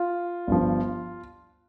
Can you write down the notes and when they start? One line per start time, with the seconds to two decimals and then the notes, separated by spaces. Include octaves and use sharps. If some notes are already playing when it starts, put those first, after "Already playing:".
Already playing: F4
0.47 G1 G2 F3